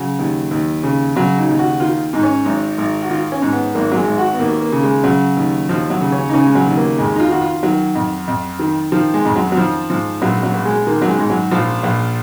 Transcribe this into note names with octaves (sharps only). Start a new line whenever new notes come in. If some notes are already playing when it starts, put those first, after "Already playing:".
Already playing: C#3 F#3
D#2
D#2
C#3
C#3 F#3
D#4
D#2
F#4
D#3 F4
G#2 D#4
C#4
G#1 D#4
G#1
F#4
D#3 F4
C#4
G#2
B3
G#1 A#3
F#3
G#3
G#1
F#4
B3
D#2 A#3
A#3
C#3
G#3
C#3 F#3
D#2
D#2 F3
F#3
C#3
C#4
D#4
C#3 C#4
G#3
F#3
D#2
A#3
F2 G#3
D#4
F4
D#3 F#4
F4
D#3 F#3
F2
F2
D#3
D#3 F3
G#3
F2
F#3
F#3
D#3 F3
G#2 F3
A#1 F#3
F#3
A#1
G#3
D#3 A#3
F#3
G#3
G#2 G#3
F#3
A#1 F3
A#1